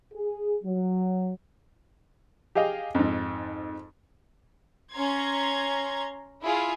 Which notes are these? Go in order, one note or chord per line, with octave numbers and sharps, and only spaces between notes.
G#4
F#3
G4 G#4 D#5 F5 G5
F2 G#2
C#4 A#5 C6 G#6
E4 F4 G#4